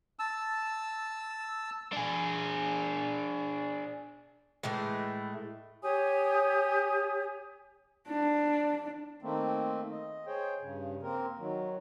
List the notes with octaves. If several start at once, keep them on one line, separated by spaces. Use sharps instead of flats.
A5 E6
D4 G#4
A2 E3 G#3 A3
G4 C#5 G#5 D#6
D4
D#3 A3 A#3 C4
D#5
G#4 C5 C#5 G5
G2 C#3
A#3 C4 A#4
D#3 F#3